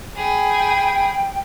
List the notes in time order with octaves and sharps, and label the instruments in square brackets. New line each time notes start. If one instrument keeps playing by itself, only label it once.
[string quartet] G#4 B5 [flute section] G5